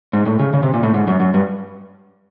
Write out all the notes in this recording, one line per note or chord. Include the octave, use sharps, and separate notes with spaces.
G#2
A2
C#3
C#3
C3
A#2
A2
G#2
F#2
F#2
G2